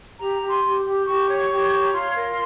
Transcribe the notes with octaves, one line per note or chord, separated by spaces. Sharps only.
G4 A#5
G4
C6
G4
G4
G4 C#6
C#5
C#6
G4
C#6
C#5
A#5
F4 C6
A#4